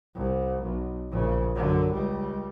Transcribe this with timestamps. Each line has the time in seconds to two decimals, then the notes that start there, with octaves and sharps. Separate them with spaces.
0.16 C2
0.62 B1
1.11 A#1 C#3
1.55 F#2 D3
1.92 C#2 G3